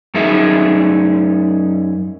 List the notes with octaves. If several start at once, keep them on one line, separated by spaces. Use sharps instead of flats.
F#2 D#4 G#4 E5